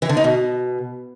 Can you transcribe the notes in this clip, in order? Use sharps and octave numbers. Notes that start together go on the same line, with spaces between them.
E3
D3
D#4
B2